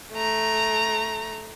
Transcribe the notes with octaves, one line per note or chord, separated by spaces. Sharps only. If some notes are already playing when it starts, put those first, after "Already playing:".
A3 A#5